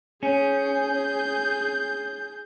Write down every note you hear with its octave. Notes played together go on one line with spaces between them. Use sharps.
C#4 G#4 G6